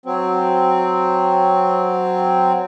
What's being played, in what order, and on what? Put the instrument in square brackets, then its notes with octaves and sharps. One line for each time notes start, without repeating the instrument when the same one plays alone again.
[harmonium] F#3 C4